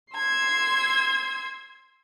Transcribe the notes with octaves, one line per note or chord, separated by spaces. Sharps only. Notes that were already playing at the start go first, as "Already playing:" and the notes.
C6 E6 G#6